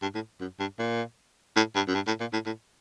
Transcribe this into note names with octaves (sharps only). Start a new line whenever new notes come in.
G2
A2
F#2
G2
A#2
A2
G2
F#2
G2
A2
A#2
A2
A2